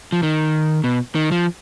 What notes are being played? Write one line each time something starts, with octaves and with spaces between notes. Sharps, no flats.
F3
D#3
B2
D#3
F3